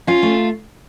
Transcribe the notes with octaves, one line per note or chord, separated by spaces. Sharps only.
C#4 F4
A3